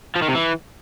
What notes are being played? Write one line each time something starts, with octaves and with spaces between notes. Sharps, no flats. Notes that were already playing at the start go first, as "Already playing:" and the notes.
F3
D#3
C3
E3